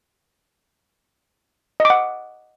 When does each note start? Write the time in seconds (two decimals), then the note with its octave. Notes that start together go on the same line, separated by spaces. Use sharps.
1.80 D#5
1.85 D6
1.90 F#5